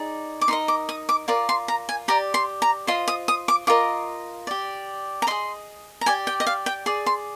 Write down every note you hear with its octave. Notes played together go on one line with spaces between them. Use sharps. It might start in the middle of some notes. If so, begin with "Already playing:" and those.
Already playing: D#4 G#4 D5
D6
D#4 A#4 D#5 C6
D6
D#6
D6
F4 A#4 D5 D6
C6
A#5
G#5
G4 D5 A#5
C6
A#5
F4 C5 D#5 C6
D#6
D#6
D6
F4 A#4 D#5 D6
G4 D5
A#5
G#4 D#5 C6
A#5
G4 D5 G#5
G5
D#5
F5
G5
G#4 D5
C6